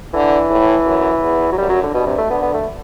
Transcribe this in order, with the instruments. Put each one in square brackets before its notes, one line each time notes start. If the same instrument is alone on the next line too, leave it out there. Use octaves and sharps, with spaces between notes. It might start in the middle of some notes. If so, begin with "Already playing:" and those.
[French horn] D3 [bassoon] E3
[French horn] A2
F#2
E2
[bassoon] F#3
[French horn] F#2 [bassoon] G3
[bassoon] F#3
D3
[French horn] G2 [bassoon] B2
[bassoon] C3
A3
[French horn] D3 [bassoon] B3
[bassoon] B3
A3